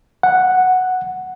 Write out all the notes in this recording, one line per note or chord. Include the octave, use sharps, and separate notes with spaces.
F#5